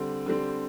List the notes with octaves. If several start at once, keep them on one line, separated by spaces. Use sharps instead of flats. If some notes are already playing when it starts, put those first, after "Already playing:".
Already playing: D3 G3 C4
D3 G3 C4